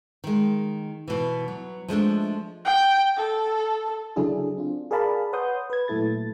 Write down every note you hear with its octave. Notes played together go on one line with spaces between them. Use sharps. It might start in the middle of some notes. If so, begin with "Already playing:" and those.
D#3 G#3
B2 E3
F#3
F3 G#3 A3 D4
G5
A4
C#3 F#3 D4 E4 G#4 A4
C4 D4 F4
G#4 A#4 D5 F5 A5 B5
B4 C#5 F#5 C6 D#6 G6
B4 G#6
A#2 F#3 A3 E4 A4 A6